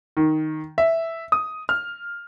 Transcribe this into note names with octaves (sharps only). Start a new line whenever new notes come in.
D#3
E5
D#6
F6